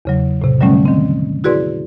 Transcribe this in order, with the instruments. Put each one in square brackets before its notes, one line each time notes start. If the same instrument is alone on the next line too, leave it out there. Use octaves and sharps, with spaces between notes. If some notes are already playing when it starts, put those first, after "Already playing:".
[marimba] E2 C#3 F#3
A2 C3
D3 F#3 G3 A3 C#4
D#3 C4
E4 F#4 G#4 B4 D5 C6